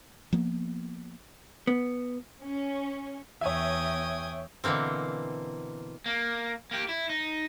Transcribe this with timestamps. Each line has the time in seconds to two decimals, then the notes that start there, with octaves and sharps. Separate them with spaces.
0.33 F3 A#3 B3
1.67 B3
2.43 C#4
3.41 E2 C#5 E5 G5 G#5 D#6
4.64 B2 D3 E3 A#3 C4
6.06 A#3
6.71 A#3 G4
6.89 E4
7.10 D#4